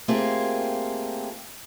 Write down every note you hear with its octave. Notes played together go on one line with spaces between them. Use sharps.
A3 A#3 C4 F4 G4 G#4